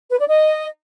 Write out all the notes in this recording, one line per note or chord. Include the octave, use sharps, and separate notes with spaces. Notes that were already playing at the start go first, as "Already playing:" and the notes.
B4
D5
D#5